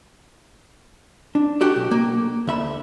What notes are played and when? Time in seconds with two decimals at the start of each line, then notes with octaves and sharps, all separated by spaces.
1.35 D4
1.61 F#4 G4 A4
1.76 B1
1.91 A#3
2.47 D2 E5 B5